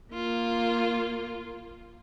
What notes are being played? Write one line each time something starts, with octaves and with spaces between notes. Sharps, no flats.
A#3 F4